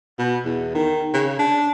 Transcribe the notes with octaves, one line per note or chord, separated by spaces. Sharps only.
B2
E2
D#3
C#3
D4